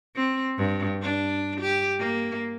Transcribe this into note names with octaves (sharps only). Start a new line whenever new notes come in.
C4
G2
D4
G4
A#3